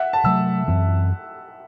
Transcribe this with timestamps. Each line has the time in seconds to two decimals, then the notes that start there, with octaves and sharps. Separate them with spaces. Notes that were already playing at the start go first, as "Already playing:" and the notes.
Already playing: E5 F#5
0.13 A5
0.24 C3 F#3 A3 E6
0.68 F#2 E3 C4